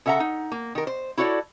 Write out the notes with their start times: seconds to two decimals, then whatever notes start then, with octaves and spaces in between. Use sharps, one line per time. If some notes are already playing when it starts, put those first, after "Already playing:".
0.06 C#3 A4 E5 F#5 A#5
0.20 D#4
0.52 A#3
0.75 D#3 A#4
0.87 C5
1.17 E4 F#4 A4 C#5 D5